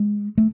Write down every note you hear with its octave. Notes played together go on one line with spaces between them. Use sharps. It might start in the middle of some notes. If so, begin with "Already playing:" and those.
Already playing: G#3
A3